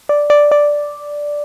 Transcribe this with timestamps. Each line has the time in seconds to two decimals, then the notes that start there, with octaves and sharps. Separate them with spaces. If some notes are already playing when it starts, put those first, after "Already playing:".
0.09 D5
0.30 D5
0.51 D5